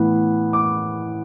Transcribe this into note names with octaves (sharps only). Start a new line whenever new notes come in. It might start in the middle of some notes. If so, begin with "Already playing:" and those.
Already playing: A2 E3 B3
D6